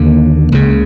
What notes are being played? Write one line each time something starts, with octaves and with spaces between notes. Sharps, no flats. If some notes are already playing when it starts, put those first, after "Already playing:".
Already playing: D#2 D3 A#3
C#2 C#3